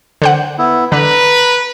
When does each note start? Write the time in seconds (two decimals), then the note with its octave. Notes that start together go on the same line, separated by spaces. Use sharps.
0.22 D3 C5 F#5
0.59 B3 E4
0.92 D3 B4 A#5